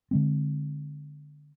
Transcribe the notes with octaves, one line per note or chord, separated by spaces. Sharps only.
D3 G#3 C4